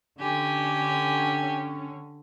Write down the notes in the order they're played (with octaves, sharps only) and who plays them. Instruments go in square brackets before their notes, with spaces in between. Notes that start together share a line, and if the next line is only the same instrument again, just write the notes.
[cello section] D3 C#4 [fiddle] G4 G#5